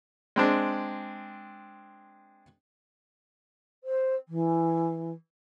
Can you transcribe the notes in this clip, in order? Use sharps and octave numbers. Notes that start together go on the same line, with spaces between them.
G#3 C4 D4
C5
E3